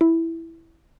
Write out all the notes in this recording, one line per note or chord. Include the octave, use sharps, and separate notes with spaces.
E4